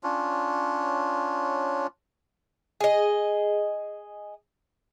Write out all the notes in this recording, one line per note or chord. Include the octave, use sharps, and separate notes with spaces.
C#4 D4 F4 C#5
G#4 D#5